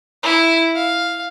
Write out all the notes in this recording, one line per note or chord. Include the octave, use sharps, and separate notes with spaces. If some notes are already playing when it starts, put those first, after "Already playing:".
E4
F5